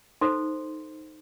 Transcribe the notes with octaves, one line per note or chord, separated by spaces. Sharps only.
D#4 A4 C5 C6